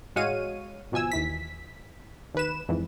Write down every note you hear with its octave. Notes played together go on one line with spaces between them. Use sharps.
A1 G#3 F#4 C#5 F5 D#7
G#1 B2 F3 G#5 E6
D#2 E3 B6
D#2 B4 E7
F2 G#2 E3